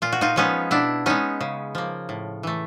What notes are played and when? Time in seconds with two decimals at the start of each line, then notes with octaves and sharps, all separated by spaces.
0.02 A#2 F4
0.12 F#4
0.21 D#4 F4
0.36 F3 G#3 B3 C#4 D#4
0.71 B2 D4 E4
1.06 G#3 B3 C#4 D#4
1.41 C#3
1.75 F3 A#3
2.09 A2
2.43 E3 A3